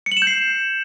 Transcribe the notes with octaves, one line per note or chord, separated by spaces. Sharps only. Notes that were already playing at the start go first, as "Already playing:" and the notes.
C#7
F#7
E7
G6
C7